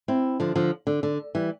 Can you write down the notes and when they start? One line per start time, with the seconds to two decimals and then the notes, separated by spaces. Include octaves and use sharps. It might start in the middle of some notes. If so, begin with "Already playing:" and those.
0.08 C4 E4
0.40 D3 F3
0.55 D3 F3
0.87 D3
1.03 D3
1.35 E3 G3